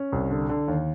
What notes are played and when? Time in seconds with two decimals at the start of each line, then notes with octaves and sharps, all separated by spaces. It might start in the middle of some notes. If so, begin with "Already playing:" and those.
Already playing: C#4
0.12 C2
0.31 D3
0.49 D3
0.68 D#2